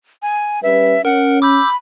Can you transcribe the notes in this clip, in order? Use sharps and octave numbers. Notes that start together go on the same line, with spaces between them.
G#5
G3 C#4 B4 E5
C#4 A#4 F#5
B5 D6 E6 G6